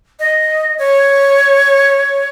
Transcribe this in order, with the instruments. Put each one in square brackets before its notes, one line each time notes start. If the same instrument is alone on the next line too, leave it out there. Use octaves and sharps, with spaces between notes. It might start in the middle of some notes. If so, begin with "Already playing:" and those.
[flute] D#5
C#5